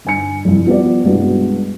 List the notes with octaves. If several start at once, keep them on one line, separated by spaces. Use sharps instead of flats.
G1 G#5 C#7
C2 F2
F3 B3 G4 D5
C2 G2 B2 G#3 B3